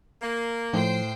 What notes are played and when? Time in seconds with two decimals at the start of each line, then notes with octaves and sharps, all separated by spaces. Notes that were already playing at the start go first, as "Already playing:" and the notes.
0.22 A#3
0.73 A2 F3 C5 G5 C7